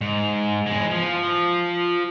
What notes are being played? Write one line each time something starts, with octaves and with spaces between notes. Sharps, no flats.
G#2
E2 G#3
F3